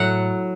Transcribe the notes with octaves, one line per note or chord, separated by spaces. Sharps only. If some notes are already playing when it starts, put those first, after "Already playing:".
Already playing: A2 F#3 F#5